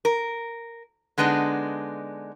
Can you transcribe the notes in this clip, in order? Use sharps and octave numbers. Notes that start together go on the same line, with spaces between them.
A#4
D3 G#3 B3 D4 D#4